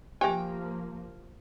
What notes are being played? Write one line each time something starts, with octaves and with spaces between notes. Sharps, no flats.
F3 A#3 G4 C5 E5 G5 G#5